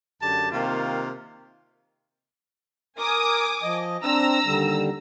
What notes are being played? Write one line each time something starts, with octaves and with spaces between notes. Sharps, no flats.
F#2 D3 G4 A5
C3 D#3 A#3 F4
A#4 G#5 D6 D#6
F3 D#5
C4 D4 A#5 E6
D#2 D3 G3